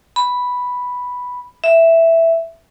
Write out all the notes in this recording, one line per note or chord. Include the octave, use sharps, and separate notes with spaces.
B5
E5